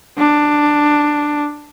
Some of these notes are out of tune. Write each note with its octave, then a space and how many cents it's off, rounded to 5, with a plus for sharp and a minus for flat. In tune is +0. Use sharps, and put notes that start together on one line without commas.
D4 +10